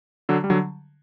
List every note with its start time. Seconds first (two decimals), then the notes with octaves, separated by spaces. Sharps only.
0.29 D3 F#3
0.44 G3
0.50 D3 F#3